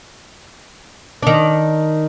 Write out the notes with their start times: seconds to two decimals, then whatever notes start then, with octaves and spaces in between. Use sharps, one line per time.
1.23 D#3 D4